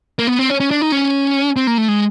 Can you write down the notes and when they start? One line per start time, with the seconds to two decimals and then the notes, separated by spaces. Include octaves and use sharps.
0.19 A#3
0.27 B3
0.39 C4
0.50 C#4
0.60 C#4
0.71 D4
0.81 D#4
0.92 C#4
1.56 C4
1.67 A#3
1.78 A3
1.88 G#3